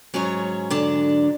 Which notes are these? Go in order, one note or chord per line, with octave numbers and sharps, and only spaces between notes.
G#2 F#3 C#4 C#5
D3 D4